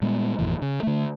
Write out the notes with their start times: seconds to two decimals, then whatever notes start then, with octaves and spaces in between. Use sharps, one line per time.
0.02 A#2 G3 G#3 B3
0.39 G#1 F2 A#2 E3
0.62 C#3
0.83 D3 A3